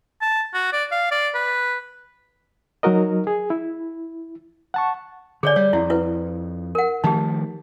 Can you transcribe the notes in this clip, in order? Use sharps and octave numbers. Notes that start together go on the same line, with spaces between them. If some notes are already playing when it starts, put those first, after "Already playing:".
A5
F#4
D5
F5
D5
B4
F#3 D#4 F#4 A#4 D#5
G#4
E4
F#5 A5 C#6
D3 G#4 C#5 D5
G3 C#5
F2 E4
E4 B4
A#4 F#5
D#3 F3 A3 D#4 G4